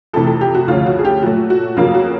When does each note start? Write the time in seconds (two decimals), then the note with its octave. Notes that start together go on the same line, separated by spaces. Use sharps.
0.13 F2 C3 E3 A3 A4
0.27 A4
0.41 G4
0.55 F#4
0.68 D2 C#3 F3 A3 F4
0.86 F#4
0.99 G#4
1.05 G4
1.22 A#2 F#3 A3 F#4
1.50 F#4
1.77 F2 C#3 F#3 A#3 F4
1.95 F#4